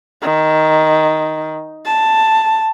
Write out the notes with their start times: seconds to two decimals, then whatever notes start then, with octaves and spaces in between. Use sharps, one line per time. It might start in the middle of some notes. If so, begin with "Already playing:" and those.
0.22 D#3
1.86 A5